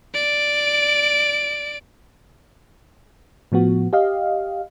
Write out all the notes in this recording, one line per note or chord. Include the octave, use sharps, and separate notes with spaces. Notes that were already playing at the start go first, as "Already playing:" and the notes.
D5 D7
A2 F3 B3 F#4
G4 D#5 F5